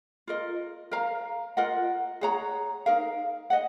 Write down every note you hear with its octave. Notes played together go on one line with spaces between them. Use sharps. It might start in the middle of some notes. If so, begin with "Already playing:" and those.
F4 A#4 D#5
A#4 F5 A#5
F4 A#4 D#5 F#5
G#4 C#5 F#5 A#5
D#4 A#4 F5
D#5 F#5